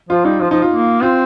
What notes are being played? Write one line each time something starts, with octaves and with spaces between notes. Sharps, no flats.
F3 F4
G3 D#4
F3 F4
F3 D#4
F4
A#3
C4 F4